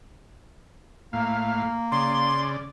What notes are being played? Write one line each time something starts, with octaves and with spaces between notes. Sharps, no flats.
A2 A#3 F5
C#3 D5 C6